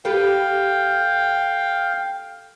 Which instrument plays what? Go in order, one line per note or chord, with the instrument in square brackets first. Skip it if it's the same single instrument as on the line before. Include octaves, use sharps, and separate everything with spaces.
[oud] G4 A4 B4 [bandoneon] F5 G5